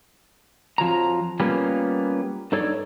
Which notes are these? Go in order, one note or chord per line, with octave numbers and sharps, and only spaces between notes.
F2 F3 F#3 A#5
G3 A#3 B3 C#4 F4
G2 D#4 A4 C#5 D5